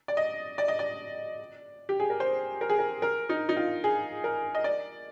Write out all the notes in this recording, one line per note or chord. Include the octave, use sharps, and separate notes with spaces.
D5
D#5
D5
D#5
D5
G4
G#4
A#4
C5
A#4
G#4
A#4
A#4
D#4
D#4
F4
G#4
A#4
D#5
D5